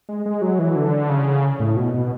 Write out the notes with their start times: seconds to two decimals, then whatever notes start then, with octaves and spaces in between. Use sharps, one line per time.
0.09 G#3
0.26 G#3
0.42 F#3
0.59 E3
0.76 D3
1.09 C#3
1.60 A2
1.76 B2
1.94 B2